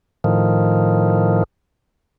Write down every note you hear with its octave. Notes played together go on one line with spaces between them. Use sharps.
A2 D#3 F3